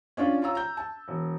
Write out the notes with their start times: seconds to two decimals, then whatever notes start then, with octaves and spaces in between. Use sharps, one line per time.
0.17 C#4 D4 F4
0.42 F4 C#5 A#5 E6
0.55 A#5 G6
0.77 A5
1.08 E1